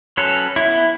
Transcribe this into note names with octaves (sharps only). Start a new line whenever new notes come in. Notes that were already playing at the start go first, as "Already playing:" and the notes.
F#3 C#4 A4 B4
B3 E4